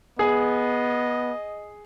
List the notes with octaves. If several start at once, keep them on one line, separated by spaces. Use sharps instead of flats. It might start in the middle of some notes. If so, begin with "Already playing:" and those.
B3 G#4 D#5